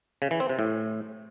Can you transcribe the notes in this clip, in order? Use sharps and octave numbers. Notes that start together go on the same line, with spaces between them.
C#3
E3
C4
C3
A2